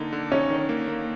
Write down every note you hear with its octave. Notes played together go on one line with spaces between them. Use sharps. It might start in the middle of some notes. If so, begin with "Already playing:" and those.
Already playing: D3 A#3 D#4
D3
C#4 D#4
D#3
A#3
A#3